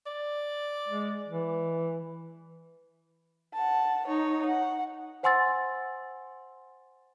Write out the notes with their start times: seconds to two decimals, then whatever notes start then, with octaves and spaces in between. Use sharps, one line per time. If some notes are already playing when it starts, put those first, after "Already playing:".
0.06 D5
0.88 G#3
1.27 E3
3.54 F#5 A5
4.07 D#4 C#5
4.46 F#5
5.23 C5 F#5 G#5 C6 E6 A6